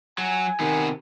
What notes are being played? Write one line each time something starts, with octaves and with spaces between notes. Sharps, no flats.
F#3 G#5
C3 D#3 B3